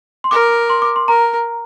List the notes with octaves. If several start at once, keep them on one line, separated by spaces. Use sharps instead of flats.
C6
A#4 D6
C6
D6
C6
A#4 A#5